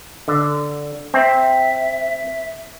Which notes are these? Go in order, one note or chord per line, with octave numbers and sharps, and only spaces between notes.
D3
C4 E5